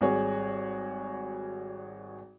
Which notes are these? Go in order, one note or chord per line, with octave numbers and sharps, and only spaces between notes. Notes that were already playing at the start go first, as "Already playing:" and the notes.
G#1 G3 F#4 G#4 C#5